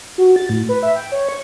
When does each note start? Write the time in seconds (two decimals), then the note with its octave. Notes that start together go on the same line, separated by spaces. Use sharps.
0.18 F#4
0.36 A6
0.49 A2
0.69 B4
0.83 E5
0.96 G5
1.12 C#5
1.29 C#6